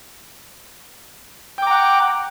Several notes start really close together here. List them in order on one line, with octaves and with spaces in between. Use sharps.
G5 D6 A#5 F#5